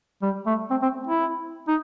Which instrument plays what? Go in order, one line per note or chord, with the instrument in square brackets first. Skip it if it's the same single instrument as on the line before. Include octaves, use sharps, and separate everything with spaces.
[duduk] G3
A3
C4
C4
E4
D#4